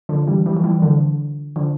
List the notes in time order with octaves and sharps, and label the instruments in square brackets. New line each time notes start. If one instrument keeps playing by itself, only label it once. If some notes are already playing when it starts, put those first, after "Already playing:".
[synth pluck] D3 F3
E3 G3
E3 G3
F3
E3 G3
D3 F3
D3 F3